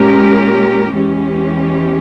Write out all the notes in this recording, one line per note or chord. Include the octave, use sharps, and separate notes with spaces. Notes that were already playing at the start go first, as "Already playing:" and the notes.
Already playing: A#2 G#3 C#4 G4 A#4
E2 E3 G#3 C#4 G4